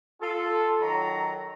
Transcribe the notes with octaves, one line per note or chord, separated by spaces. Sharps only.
F4 A4
D#3 F#3 A#5